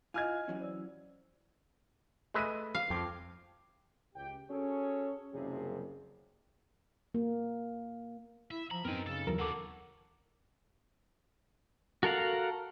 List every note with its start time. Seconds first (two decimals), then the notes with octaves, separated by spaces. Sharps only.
0.14 E4 F4 D#5 G#5 F6 G#6
0.48 E3 F#3 C#4
0.60 C5 D5 E6
2.34 G#3 A3 B4 E5 D#7
2.75 F5
2.90 F2 G5 D6
4.15 C#2 G4 G5
4.49 C#4 F#4 G#4 A4 C#5
5.32 F#1 F#2 C3 F3 G3 G#4
7.14 A#3
8.51 E4 E5
8.71 F3 A#5 B5
8.85 F#2 B3 C4 D#4 A#4 G#5
9.07 C#3 A4
9.27 D#2 E3 F#3 A#4
9.39 C4 F#4 A4 F#5 D6
12.03 F#4 A4 A#4 F5 F#5